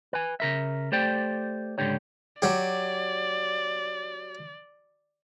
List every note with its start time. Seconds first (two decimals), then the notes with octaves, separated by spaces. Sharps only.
0.13 B4 G#5
0.40 C#3 A#4 E5
0.92 A3 G4 C5 D5 G5
1.78 C#2 G#2 D3 G4 C#5
2.42 F#3 G4 D5